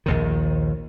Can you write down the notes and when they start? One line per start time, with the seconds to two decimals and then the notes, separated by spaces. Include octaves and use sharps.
0.06 A#1 D#2 D#3